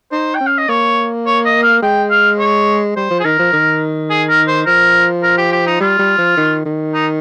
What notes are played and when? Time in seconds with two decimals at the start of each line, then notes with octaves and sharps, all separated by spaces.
0.12 D#4 C5
0.35 G5
0.41 C#4
0.47 F5
0.58 D#5
0.68 A#3 C#5
1.26 C#5
1.45 D#5
1.63 F5
1.82 G#3 G5
2.10 F5
2.39 C#5
2.96 G3 C5
3.10 F3
3.20 G#4
3.24 D#3 A#4
3.39 F3
3.53 D#3
4.10 G#4
4.29 A#4
4.47 C5
4.66 F3 A#4
5.23 A#4
5.38 G4
5.52 G4
5.66 D#4
5.80 G3 F4
5.99 G3
6.18 F3
6.37 D#3
6.66 D#3
6.93 D#4